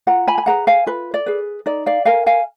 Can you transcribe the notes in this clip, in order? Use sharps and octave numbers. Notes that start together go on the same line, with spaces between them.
F4 F#5 A#5
G#5 B5
G#5
G#4 B4 F#5 A#5
F5 G#5
F4 B4
D5
G#4 B4
D#4 D5
D5 F5
A#4 F5 G#5
F5 G#5